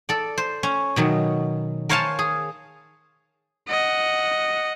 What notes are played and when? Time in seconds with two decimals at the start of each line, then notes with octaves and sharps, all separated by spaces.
0.09 A4 D5
0.38 C5
0.63 C#4
0.96 B2 D#3 F#3
1.89 A#4 C5 C#5 F5 G#5 A5
2.19 G#4
3.68 D#5 F#5